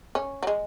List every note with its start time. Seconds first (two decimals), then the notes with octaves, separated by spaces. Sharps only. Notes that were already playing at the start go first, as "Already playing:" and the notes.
0.15 C#4
0.43 F#3
0.47 G#3